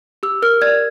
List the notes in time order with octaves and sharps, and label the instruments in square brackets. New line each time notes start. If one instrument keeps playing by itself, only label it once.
[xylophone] G4 E6
A#4 F6
D5 G#6